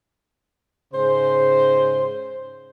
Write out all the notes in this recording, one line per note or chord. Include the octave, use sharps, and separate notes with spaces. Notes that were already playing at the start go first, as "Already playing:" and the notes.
G#2 C#3 C5